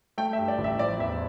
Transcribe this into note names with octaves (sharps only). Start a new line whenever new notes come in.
A3 G5
E5
G2
D5
A1
E5
F3 D5
E2 E5